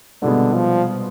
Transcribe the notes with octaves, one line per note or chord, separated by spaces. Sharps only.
C2 B2 D3 G#3 B3
F3